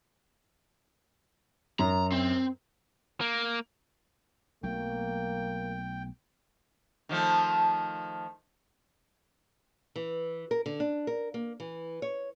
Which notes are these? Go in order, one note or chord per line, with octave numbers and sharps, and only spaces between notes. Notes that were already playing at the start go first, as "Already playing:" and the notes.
F#2 A#5
C4
A#3
B1 F#3 A3 A#3 G5
D#3 F3 A3
E3
A#4
D3
D4
A#4
A#3
E3
C#5